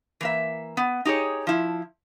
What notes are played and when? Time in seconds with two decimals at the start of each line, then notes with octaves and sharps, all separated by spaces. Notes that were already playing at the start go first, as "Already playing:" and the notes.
0.21 E3 A#3 E5
0.77 B3
1.05 D#4 G4 G#4 C#5
1.47 F3 E4